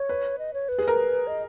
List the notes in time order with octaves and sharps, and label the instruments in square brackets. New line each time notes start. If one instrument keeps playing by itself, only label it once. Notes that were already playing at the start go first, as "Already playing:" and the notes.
Already playing: [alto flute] C#5
[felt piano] B4
[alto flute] D#5
C#5
B4
[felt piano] G#4
A#4
[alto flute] D#5